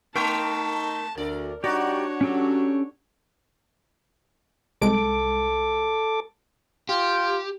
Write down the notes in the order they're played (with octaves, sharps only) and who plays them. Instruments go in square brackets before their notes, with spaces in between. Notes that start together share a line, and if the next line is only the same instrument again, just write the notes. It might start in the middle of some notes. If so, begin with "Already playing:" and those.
[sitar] A3 [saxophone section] D#4 [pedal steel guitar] A#4 G5 C6 [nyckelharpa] A5
[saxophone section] D2 [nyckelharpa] A#4 [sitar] D5
[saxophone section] G3 D#4 D5 [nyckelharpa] D4 C#5 [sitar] F#4 [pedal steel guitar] G4
[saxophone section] F#3 [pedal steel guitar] C#4 G4 A4
[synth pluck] C2 G#3 D7 [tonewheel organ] A4 D6
[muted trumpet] F4 [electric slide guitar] G4